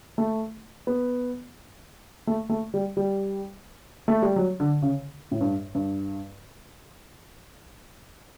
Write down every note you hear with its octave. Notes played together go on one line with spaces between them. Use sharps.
A3
B3
A3
A3
G3
G3
A3
G3
F#3
D3
C#3
A2
G2
G2